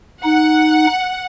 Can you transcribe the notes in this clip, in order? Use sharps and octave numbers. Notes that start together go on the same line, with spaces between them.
D#4 F#5